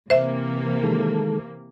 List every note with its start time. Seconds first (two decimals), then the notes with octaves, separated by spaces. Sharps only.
0.10 C3 E3 A#3 C5 E5
0.83 D#3 G#3 A4